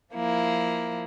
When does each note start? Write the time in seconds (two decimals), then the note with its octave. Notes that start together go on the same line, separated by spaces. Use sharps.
0.13 F3 A#3 E4